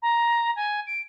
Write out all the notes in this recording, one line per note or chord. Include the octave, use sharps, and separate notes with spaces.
A#5
G#5
D7